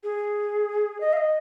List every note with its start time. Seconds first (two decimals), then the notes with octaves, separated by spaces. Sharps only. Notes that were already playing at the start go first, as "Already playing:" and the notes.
0.03 G#4
1.00 D#5
1.13 F5
1.17 D#5